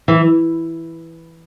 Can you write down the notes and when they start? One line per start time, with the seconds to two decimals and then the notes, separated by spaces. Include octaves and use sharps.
0.08 E3